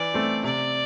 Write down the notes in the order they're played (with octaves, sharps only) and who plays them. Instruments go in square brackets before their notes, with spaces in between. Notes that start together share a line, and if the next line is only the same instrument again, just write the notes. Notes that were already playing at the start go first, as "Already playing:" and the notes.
Already playing: [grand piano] E3 [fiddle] D5
[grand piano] A3 C4
[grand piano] C3 [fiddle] D5